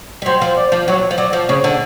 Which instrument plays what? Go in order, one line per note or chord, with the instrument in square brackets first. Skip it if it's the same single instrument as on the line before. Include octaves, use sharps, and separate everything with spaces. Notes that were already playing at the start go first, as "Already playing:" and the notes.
[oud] G3
[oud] F#3 [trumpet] C5
[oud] F3
[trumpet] D5
[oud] F3
[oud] F#3 [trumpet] C#5
[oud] F3
[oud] F#3 [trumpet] D5
[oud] F3
[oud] C#3 [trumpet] C#5
[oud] D3